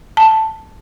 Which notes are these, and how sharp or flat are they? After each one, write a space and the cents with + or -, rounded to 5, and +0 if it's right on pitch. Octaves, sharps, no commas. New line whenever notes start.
A5 +0